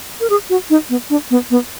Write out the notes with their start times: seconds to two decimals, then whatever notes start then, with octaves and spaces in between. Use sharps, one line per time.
0.20 A#4
0.30 G#4
0.50 F#4
0.70 D#4
0.90 B3
1.10 D4
1.30 B3
1.50 B3